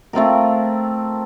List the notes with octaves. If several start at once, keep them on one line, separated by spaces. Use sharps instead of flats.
A3 C4 F4 A#4